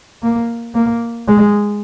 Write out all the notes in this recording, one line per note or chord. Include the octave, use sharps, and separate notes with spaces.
A#3
A#3
G#3